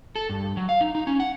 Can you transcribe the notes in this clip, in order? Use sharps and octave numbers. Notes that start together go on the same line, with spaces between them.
A4
G2
F#3
F5
D#4
D#4
C#4
F#5